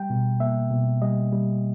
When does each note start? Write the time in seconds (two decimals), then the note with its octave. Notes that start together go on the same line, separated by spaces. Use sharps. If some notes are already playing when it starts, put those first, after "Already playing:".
Already playing: G3 G5
0.10 B2
0.40 A#3 E5
0.71 B2
1.02 G3 D#5
1.33 G3